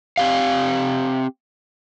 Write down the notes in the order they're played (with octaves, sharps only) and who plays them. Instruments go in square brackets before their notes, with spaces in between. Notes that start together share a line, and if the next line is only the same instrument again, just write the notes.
[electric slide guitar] C4 G4 F5